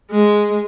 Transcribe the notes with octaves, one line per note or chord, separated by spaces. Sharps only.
G#3